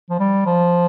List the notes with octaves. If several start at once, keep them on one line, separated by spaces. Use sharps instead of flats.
F3
G3
F3